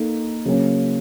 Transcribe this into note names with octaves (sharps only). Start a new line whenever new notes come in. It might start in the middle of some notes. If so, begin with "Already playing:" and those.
Already playing: A#3 D#4 A4
C#3 F#3 A#3 C#4